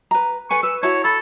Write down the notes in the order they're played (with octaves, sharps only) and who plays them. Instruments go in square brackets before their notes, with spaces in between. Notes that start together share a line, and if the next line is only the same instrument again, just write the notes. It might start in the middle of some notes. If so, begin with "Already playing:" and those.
[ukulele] B4 A#5
[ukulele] A4 B4 G#5 [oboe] C#6
[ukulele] B4 [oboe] E6
[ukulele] E4 F#4 A5 [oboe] C#5
[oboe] A4 [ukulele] B5